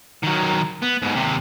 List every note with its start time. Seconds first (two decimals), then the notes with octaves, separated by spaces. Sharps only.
0.23 D#3 F#3
0.82 B3
1.02 G#2 B2
1.16 D#2 C3